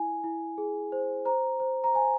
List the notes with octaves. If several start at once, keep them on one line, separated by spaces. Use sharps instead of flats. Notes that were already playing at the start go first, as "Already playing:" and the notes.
Already playing: E4 G#5
E4
G#4
C5
C5 A#5
C5
A#5
C5 G#5